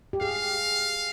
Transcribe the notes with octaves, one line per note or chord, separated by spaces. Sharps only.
G4
G#4 F5